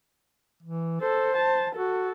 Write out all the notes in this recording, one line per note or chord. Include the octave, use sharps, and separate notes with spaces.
E3
A4 C5
A5
F#4 A4